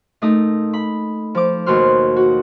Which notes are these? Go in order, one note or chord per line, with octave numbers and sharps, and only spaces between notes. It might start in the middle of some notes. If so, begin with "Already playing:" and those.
A#2 A3 D#4 D#6
B5
F3 D6
D#2 B2 F#4 C6 F6
F#4